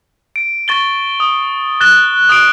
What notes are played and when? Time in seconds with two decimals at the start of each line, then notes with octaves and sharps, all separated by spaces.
0.36 D7
0.68 C#6 A6 G7
1.20 D#6
1.81 F#6 A6 E7 G7
2.29 D#6 F#6 D7